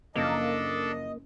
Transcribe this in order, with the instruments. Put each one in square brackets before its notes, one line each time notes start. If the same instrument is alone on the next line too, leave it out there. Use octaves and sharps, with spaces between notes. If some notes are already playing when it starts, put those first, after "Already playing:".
[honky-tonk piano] F#1 F3 [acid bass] A#3 [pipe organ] D4 A4 [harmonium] D#5